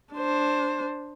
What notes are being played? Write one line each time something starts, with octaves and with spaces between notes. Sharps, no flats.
D4 C5